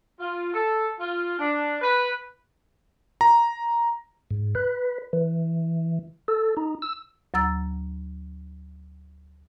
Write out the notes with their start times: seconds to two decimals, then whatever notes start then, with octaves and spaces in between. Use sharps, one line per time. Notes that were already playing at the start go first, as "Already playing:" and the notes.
0.20 F4
0.54 A4
0.99 F4
1.39 D4
1.82 B4
3.21 A#5
4.31 G#2
4.55 B4
5.13 E3
6.28 A4
6.57 D#4
6.82 E6
7.34 D2 F#3 A#5 E6 A6